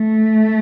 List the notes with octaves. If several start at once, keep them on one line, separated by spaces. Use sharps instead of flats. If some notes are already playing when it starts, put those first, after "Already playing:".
Already playing: A3